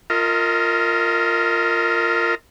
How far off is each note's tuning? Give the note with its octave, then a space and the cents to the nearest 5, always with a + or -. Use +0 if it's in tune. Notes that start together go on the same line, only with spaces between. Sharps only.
F4 +0 A#4 -25 D#5 +30